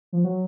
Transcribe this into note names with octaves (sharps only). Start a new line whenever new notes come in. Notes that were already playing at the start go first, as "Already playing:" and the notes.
F3
F#3